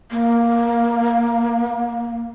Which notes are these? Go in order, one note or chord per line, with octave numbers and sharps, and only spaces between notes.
A#3